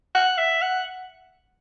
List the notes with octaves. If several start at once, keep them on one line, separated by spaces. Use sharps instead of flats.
F#5
E5
F#5